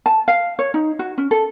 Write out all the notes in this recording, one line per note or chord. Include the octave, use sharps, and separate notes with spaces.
A5
F5
C#5
D#4
F#4
C#4
A4